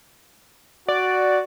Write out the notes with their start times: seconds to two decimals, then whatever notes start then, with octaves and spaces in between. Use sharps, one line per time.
0.88 F#4 D5